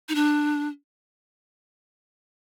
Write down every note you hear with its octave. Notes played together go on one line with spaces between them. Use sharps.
D#4
D4